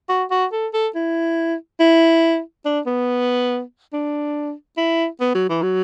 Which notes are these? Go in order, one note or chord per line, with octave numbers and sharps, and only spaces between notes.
F#4
F#4
A4
A4
E4
E4
D4
B3
D4
E4
B3
F#3
E3
F#3